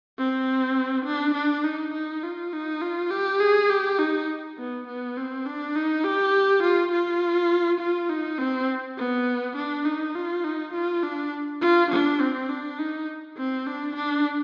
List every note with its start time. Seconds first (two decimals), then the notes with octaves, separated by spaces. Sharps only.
0.18 C4
1.06 D4
1.35 D4
1.64 D#4
1.94 D#4
2.23 F4
2.53 D#4
2.82 F4
3.11 G4
3.40 G#4
3.70 G4
3.99 D#4
4.58 B3
4.87 B3
5.17 C4
5.46 D4
5.75 D#4
6.04 G4
6.63 F4
6.92 F4
7.80 F4
8.09 D#4
8.39 C4
8.98 B3
9.56 D4
9.85 D#4
10.15 F4
10.44 D#4
10.73 F4
11.03 D4
11.61 F4
11.91 D4
12.20 C4
12.49 D4
12.79 D#4
13.37 C4
13.66 D4
13.96 D4